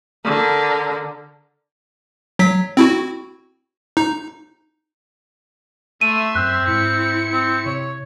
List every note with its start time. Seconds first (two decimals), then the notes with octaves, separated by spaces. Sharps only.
0.24 D3 A#4
2.39 F#3 B6
2.77 C4 E4 F#4
3.97 D#4
6.01 A3 E5 C6 D#7
6.35 F#2 C4 F#6
6.68 G#2 E4 C#7
7.32 C4
7.66 C3 C#5